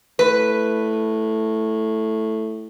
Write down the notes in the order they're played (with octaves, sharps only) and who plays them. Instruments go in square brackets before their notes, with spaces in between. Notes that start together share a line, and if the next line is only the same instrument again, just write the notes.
[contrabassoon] A2 [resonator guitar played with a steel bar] B4